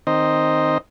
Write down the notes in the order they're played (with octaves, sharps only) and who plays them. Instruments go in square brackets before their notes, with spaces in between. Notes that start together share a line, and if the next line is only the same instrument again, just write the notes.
[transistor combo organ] D#3 C4 D#4 C5 D#5